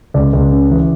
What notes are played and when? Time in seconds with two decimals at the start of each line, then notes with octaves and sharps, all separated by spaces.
0.14 C#2 D5
0.33 C#2
0.52 C#3
0.71 E3